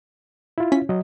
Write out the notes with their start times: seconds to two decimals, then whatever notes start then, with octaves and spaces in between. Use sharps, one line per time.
0.58 E4 F4
0.72 C#4 B6
0.89 F#3 D#5